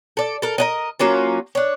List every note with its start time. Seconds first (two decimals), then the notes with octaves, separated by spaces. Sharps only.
0.17 A4 D5
0.42 A4 A#4
0.58 A#4 D5 D#5
0.99 F#3 A#3 C#4 F4
1.55 D4 C#5